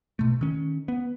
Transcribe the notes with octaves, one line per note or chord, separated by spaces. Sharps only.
B2 A3
D#3 C#4
B3